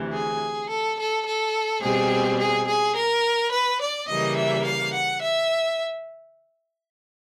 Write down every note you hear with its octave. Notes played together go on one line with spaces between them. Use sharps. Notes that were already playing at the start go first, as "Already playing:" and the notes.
Already playing: D2 C3 E3
G#4
A4
A4
A4
B2 G3 C4 G#4
G#4
G#4
A#4
B4
D5
C#3 E3 G3 A#3 D#5
E5
F5
F#5
E5